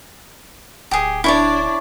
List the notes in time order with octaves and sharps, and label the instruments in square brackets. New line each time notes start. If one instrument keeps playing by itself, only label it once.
[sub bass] D1 [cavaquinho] G4 G#4
[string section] D4 [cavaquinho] E4 C#5 D5